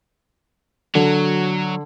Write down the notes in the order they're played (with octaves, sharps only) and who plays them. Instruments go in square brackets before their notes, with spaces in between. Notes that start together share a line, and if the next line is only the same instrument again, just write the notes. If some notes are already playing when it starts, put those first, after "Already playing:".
[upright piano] D3 [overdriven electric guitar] F#3